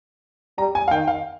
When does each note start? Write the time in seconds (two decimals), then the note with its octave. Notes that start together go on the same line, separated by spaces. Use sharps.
0.58 G3 A#5
0.75 G#5
0.88 F5
0.91 D#3 G5
1.08 F5